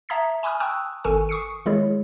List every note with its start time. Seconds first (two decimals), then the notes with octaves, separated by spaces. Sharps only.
0.09 E5 A5 A#5 D#6 G#6 B6
0.43 G#5 B5 C#6 D#6 F6
0.60 G5 A5 C#6 D#6 E6 F#6
1.04 G#1 D#3 A4 G#5 C#6
1.29 C#6 D#6 C7 C#7
1.66 D#3 G#3 E4 G#4 C#5